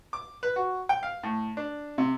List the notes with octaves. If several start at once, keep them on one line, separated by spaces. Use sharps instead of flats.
D6
B4
F#4
G5
F5
A2
D4
C3